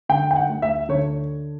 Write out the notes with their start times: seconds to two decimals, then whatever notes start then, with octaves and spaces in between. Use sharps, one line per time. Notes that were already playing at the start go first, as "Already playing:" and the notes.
0.09 D3 G5
0.31 G5
0.36 F#5
0.49 D2
0.62 E5
0.89 D3 C#5